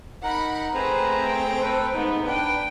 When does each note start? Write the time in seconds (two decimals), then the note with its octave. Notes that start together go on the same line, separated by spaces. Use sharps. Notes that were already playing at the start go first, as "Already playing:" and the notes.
0.23 D#4 A#4 F#5 B5
0.75 A3 C4 G#4 B4 C5 A#5
1.26 G5
1.61 A4 B4
1.94 G#2 B3 D#4
2.26 D4 B4 G5